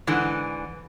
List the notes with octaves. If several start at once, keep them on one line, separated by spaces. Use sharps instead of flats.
G#2 D3 E3